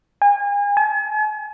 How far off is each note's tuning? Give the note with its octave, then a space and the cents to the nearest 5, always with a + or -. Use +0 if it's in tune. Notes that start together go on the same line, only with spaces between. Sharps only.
G#5 -35
G#5 +45